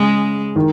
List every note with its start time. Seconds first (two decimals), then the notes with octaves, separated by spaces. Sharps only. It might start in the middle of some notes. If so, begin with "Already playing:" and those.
Already playing: C#3 G#3
0.56 D#3